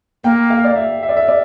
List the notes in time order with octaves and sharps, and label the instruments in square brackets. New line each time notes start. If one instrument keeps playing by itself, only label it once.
[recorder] A#3 [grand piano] G5
[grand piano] F5
D5
E5
E5
D5
E5
D5